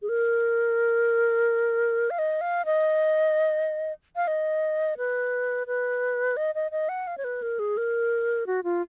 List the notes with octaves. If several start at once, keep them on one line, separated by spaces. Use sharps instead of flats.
G#4
A#4
F5
D#5
F5
D#5
F5
D#5
B4
B4
D#5
D#5
D#5
F#5
F5
C#5
B4
A#4
G#4
A#4
F#4
F4